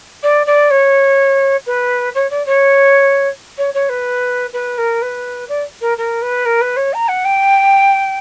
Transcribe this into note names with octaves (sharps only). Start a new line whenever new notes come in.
D5
D5
C#5
B4
C#5
D5
C#5
C#5
C#5
B4
B4
A#4
B4
D5
A#4
A#4
B4
A#4
B4
C#5
A#5
F#5
G5